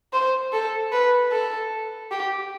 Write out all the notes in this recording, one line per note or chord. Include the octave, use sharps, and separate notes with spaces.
C5
A4
B4
A4
G4